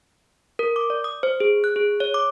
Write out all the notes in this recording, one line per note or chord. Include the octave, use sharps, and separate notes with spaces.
A#4
D6
D5
D#6
C5
G#4
F#6
G#4
C#5
D6